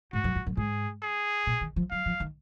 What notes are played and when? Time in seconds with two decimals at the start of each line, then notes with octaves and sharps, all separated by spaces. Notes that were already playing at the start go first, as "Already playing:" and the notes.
0.13 G#2 F#4
0.24 F#2
0.35 F2
0.46 F#2
0.57 G#2 G#4
1.02 G#4
1.47 A#2
1.61 D#3
1.76 F3
1.91 F#3 F5
2.06 F3
2.20 D#3